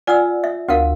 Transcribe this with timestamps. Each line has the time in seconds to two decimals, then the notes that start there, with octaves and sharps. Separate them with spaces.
0.07 F4 D5 F#5 G#5 E6
0.44 E5
0.69 D2 F#4 A#4 F5